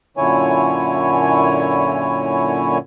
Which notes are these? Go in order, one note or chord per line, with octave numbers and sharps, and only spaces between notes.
F#2 A#2 D3 E4 C#5 G#5